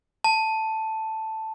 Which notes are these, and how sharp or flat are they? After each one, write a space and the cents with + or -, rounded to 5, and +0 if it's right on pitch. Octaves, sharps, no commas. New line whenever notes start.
A5 +5